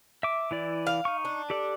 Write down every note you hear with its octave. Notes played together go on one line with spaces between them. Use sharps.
E5 D6
E3 E4 D5
F5
D#4 C#6
D4
G4 A4 D5